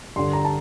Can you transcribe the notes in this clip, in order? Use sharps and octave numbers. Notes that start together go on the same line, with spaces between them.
G2 D3 C6
A#5
A5